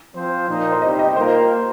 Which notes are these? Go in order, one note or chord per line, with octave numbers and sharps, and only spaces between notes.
F3 C4 F4 C5
A#2 A#3 D#4
C5
C3 G3 D#4 G4 D#5
D#5
A#3 F4 A#4 C5